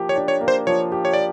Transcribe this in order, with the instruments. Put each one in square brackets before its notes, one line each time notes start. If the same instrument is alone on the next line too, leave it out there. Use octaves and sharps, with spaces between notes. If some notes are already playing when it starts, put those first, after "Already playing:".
Already playing: [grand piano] F3 A#3 G4
[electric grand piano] C#5
[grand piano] D4
[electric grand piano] C#5
[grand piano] A#3
[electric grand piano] C5
[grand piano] F3 [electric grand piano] C#5
[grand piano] G4
[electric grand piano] C#5
D5